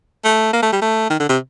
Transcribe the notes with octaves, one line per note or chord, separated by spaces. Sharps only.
A3
A#3
A3
G3
A3
D#3
D3
C3